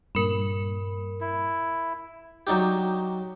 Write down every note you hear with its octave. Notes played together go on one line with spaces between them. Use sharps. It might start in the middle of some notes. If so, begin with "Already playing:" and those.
G2 A#2 A#4 B5
E4
F#3 D4 D#4 G4